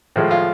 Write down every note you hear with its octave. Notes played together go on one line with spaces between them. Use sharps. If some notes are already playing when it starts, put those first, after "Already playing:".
A2 F3 G#3
F4